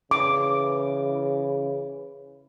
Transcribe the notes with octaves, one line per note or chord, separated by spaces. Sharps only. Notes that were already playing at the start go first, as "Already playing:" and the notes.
C#3 E3 D6